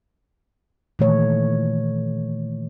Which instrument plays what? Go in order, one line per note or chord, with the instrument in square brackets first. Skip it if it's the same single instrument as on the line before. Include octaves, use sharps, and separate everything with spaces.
[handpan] A#2 D#3 E3 A3 C#5